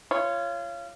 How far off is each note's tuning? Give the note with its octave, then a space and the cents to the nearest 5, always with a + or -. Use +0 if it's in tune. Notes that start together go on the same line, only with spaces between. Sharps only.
F4 -25 C#5 +0 C#6 +0